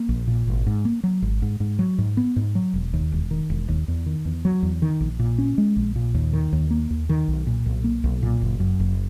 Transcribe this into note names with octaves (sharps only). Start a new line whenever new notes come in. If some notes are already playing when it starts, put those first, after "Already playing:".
Already playing: A#3
A#1
A#2
G#1
G#2
A#3
F#3
G#1
G#2
G#2
F#3
G#2
B3
G#2
F#3
E1
D#2
E1
D#3
E1
D#2
E2
D#3
E2
F#3
E2
D#3
A#1
A#2
C#4
G#3
A#1
A#2
D#2
D#3
D#2
A#3
D#2
D#3
B1
A#2
B1
A#3
B1
A#2
F#1
F#2
F#1